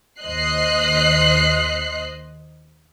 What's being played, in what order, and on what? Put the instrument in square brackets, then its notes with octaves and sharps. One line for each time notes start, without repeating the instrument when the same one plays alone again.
[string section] D#2 C5 D#5 F#6 C7